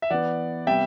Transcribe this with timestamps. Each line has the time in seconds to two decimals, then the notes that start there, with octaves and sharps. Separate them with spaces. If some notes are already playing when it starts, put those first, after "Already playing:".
0.02 E5
0.10 E3 B3 D5 F#5
0.67 C3 G3 B3 E5 G5